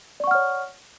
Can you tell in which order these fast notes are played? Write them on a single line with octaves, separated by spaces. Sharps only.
D5 C#6 F#5 F6 C#5